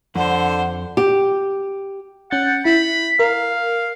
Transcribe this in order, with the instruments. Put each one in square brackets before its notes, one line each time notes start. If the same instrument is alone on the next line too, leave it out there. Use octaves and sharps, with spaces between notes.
[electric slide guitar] F2 [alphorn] D3 [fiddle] C5 [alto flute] F#5
[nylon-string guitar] G4
[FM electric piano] C#4 G6 A6 [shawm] F#5
[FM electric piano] E4 [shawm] B5
[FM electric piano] A#4 [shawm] F5